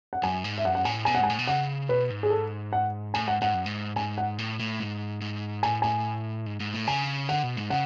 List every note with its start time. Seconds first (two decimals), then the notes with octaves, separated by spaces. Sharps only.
0.13 F#5
0.23 F#2 G#5
0.44 G#2
0.58 E5
0.65 F#2 F#5
0.75 F#5
0.85 A2 G#5
1.05 B2 G#5
1.15 F#5
1.21 G#2 G#5
1.30 A2
1.39 B2
1.47 C#3 F#5
1.89 B2 B4
2.10 G#2
2.23 G#4
2.30 A4
2.73 F#5
3.14 A2 G#5
3.28 G#2 F#5
3.42 G#2 F#5
3.54 F#2
3.66 G#2
3.96 G#2 G#5
4.18 F#5
4.38 A2
4.59 A2
4.80 G#2
5.21 G#2
5.63 A2 G#5
5.82 A2 G#5
6.46 G#2
6.60 G#2
6.74 A2
6.87 C#3 G#5
7.29 D3 F#5
7.43 B2
7.57 G#2
7.70 C#3 F#5